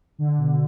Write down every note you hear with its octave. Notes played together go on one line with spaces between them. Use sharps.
D3
B2